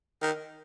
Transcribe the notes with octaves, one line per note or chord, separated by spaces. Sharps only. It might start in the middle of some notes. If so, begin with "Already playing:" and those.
D#3